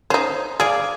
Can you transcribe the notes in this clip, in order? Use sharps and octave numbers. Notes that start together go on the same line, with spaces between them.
C#4 D#4 C5
G#4 D5 F5